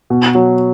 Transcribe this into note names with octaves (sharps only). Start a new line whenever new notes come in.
B2
F#3